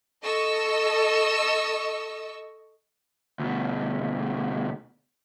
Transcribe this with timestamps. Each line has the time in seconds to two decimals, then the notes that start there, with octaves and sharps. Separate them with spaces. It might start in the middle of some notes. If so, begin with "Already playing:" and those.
0.22 A4 D#5 C#6 E6
3.39 D2 B2